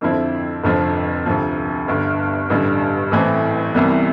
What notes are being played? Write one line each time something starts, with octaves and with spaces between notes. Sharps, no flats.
F2 D3 F3 C4 E4
F1 F2 D3 F3 C4
D2 C3 F3
G1 G2 D3
A1 G2 D3 G3
A1 A2 E3 A3 C4
C2 C3 E3 G3 B3